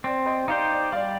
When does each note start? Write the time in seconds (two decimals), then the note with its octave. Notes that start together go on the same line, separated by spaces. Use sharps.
0.04 C4 D5
0.26 C5 D#5
0.48 D#4 G4 C5 D5 F5
0.70 D5
0.92 G3 D5 F5